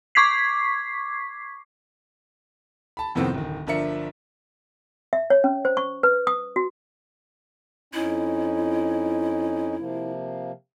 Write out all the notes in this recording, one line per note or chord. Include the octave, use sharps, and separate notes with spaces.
C#6 D6 G#6 B6 C7
A5 B5
F2 A2 C3 D#3 B3 C4
D1 D#3
G1 F3 D4 A#4 E5 C#7
E5
C#5
C#4
C5
C#6
B4
D#6
F#4
F2 C#4 D#4 E4
C3 F3 A#3